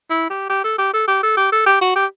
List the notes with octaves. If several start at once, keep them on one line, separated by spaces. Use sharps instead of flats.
E4
G4
G4
A4
G4
A4
G4
A4
G4
A4
G4
F#4
G4